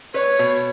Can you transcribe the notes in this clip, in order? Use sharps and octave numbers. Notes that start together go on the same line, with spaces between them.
B4 C#5
B2